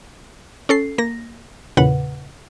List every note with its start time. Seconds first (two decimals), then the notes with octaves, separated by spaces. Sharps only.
0.69 C#4 A4 C7
0.98 A#3 A#6
1.77 E2 A#2 C#3 B4 F#5